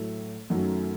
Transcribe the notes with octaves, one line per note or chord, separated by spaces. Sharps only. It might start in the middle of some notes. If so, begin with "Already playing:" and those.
Already playing: A2 F#3 A3
F#2 D#3 F#3 A3 F#4